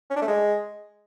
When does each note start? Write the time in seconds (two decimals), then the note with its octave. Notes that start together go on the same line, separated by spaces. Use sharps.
0.10 C#4
0.16 D4
0.22 A3
0.27 G#3